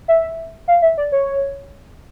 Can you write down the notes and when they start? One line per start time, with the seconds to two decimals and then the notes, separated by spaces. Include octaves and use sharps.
0.08 E5
0.68 F5
0.82 E5
0.98 D5
1.12 C#5